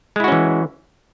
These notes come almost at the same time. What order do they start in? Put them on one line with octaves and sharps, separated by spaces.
G#3 E4 F#4 C#4 E3